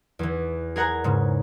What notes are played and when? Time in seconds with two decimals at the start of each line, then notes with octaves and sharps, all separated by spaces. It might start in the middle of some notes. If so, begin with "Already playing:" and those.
0.19 E2 E3
0.76 G#4 A#4 F#5 G#5 A#5
1.04 G#2 C#3